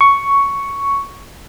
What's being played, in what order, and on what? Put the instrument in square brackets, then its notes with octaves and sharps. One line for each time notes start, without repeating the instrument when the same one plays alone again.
[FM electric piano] C#6